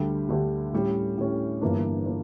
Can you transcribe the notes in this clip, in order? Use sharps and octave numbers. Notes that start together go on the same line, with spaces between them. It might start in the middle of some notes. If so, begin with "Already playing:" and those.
Already playing: D2 D3 G3 D4 G4
D2 D3 G3 D4 G4
A2 G3 C#4
A2 G3 C#4
G1 G2 E3 A#3 D4
A#3 D4